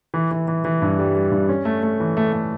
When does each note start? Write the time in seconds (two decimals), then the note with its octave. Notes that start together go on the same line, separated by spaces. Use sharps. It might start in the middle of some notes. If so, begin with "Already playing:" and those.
0.14 E3
0.31 E3
0.48 E3
0.65 E3
0.82 G2
0.99 G3
1.15 G3
1.32 G2
1.49 C#4
1.65 A3
1.83 A3
2.00 E3
2.17 A3
2.33 A3